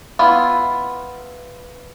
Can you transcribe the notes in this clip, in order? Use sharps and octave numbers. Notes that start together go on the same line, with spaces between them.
B3 E4 F4